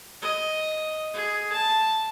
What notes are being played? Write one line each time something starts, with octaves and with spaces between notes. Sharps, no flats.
D#5
G#4
A5